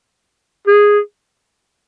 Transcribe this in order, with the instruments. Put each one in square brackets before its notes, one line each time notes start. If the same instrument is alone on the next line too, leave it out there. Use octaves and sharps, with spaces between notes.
[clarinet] G#4